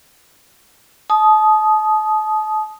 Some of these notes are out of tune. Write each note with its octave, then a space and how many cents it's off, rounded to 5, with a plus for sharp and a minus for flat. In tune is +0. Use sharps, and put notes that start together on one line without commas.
A5 -35 D#6 +0